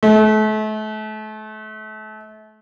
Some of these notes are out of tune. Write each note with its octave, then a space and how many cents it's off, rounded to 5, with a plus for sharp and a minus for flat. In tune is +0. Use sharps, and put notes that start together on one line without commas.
A3 -35